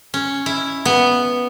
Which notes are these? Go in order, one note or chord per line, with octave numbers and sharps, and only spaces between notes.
C#4
E4
B3